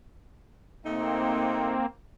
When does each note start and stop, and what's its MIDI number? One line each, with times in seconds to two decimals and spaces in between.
0.85 1.75 48
0.85 1.75 57
0.85 1.86 58
0.85 1.86 60
0.85 1.75 63